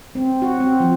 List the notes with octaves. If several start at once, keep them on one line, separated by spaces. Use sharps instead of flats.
C4
F#4
C4
F3